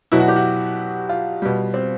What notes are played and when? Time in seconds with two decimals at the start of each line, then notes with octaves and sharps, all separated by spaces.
0.12 B2 F#3 E4
0.20 F#4
0.28 G4
0.36 F#4
1.09 F4
1.42 B2 G3
1.74 C4